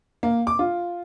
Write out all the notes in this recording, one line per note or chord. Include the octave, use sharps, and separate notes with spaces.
A#3
D6
F4